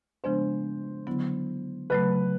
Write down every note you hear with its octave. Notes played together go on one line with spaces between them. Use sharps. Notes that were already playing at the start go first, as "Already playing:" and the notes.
C#3 F3 G#3 B3 D4 C5
D3 F#3 B3 E4
C#3 F#3 A3 B4